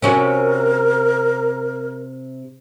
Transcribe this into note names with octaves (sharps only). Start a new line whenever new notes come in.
C3 C#4 F#4 A#4